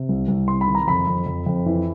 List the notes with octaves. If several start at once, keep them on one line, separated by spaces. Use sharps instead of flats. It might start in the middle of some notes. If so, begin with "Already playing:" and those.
Already playing: C3
C2
C2
C3 C6
B5
D#3
A#5
F2 B5
F2
F2
F2
E3